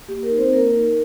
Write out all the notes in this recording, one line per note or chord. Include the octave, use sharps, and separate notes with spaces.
A#3 G4
A#4
D#4
C4 C5
A#3 A#4
D#4